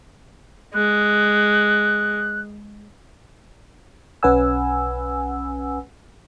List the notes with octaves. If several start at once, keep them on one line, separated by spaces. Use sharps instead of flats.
G#3 F#6
B1 C#4 B4 F#5 G#5 E6